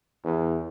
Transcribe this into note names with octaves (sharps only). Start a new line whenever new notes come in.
E2